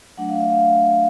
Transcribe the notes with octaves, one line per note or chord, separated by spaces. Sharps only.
F#3 A3 D4 F#5
F5
E5
F5